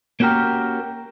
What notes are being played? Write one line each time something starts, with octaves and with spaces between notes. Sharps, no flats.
A#3 C#4 F#4 G4 A#4